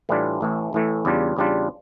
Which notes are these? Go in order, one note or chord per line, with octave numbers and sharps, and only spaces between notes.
A2 E3 G3 D4 F4
A1 A2 E3 A3
A1 A2 E3 A3
E2 C#3 G3 D4 F4
E2 C#3 G3 D4 F4